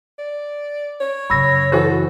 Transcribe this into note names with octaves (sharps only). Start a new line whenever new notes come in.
D5
C#5
F#2 C#3 B5 E6 A#6
E3 F#4 A4 C5